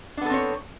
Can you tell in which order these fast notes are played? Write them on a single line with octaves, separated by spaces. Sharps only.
D4 B3 A4 C4 C#5